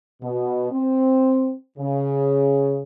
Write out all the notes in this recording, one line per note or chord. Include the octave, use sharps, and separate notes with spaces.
B2
C4
C#3